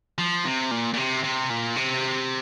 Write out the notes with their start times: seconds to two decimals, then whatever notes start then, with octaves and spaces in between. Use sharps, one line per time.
0.18 F3
0.45 C3
0.71 A#2
0.93 A#2
0.97 C3
1.24 C3
1.50 A#2
1.76 C3